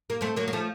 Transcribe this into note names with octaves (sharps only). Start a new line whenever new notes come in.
A#3
A3 C4
F#3 A#3
A#3
F3 A3